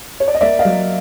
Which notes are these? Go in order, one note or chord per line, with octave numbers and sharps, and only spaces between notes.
C#5
D5
D#5
A#3 D5 E5
D#5 F5
F#3